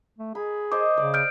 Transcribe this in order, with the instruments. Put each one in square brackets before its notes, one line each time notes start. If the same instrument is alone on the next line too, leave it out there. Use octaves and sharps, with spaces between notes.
[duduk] A3
[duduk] G#4 [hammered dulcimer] B5
[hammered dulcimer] C5 D#5 [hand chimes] D6
[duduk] C#3 [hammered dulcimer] D5
[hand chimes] F6 G6 D7